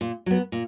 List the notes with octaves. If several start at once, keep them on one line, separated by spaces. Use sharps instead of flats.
A#2
F#3 B3
A#2